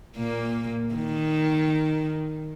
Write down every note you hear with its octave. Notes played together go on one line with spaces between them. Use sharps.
A#2 A#3
D#3